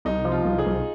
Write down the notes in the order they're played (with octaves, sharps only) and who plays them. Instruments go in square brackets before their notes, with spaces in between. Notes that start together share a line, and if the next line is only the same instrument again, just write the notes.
[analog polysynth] C2 [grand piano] D#4
[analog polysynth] F3
[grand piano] F4
[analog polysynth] C2
[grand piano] G#4
[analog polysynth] C2